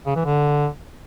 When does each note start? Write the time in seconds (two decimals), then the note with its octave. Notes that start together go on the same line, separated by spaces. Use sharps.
0.06 C#3
0.16 E3
0.25 D3